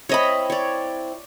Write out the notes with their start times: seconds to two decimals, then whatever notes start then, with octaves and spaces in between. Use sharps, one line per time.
0.09 C4 E4 C#5 D#5 B5
0.50 C#5 D5